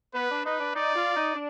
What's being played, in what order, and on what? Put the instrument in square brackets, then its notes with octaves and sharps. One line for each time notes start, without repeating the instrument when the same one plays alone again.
[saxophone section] B3 [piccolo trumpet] B4
[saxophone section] D4
[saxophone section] D#4 [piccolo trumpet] B4
[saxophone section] D4
[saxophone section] D#4 [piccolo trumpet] D5
[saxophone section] F4
D#4
D4